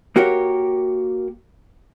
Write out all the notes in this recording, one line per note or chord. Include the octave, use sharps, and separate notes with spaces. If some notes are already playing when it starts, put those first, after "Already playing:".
A#3 F#4 G4 A#4 C#5